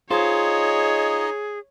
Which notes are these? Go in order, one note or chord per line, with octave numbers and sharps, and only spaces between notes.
D#4 F4 G#4 C5 C#5 D#5